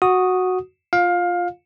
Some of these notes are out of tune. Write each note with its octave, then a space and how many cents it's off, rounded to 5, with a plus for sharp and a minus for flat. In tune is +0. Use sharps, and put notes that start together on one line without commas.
F#4 -5 D#6 +0
F4 +0 F5 +20